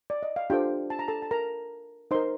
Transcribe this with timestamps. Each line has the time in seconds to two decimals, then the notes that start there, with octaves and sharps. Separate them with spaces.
0.10 D5
0.23 D#5
0.36 F5
0.50 D4 F4 G4 A4 C5 G5
0.90 A5
0.99 A#5
1.08 A4 A5
1.22 A5
1.31 A#4 A#5
2.11 D#4 A#4 C5 C6